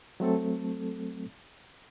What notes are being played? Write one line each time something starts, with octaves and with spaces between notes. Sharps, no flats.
F#3 A3 C4 A4